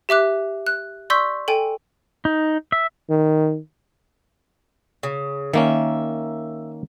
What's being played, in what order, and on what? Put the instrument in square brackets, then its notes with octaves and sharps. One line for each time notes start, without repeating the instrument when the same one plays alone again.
[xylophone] G4 E5 D6 F#6
F#6
D5 C6 C#6 E6 G6 B6
A4 G5 G#5
[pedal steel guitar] D#4
E5
[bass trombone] D#3
[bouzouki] C#3
[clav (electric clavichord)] D#3 A#3 C#4 [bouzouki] E5